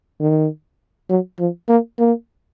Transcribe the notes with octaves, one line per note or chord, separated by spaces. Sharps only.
D#3
F#3
F3
A#3
A#3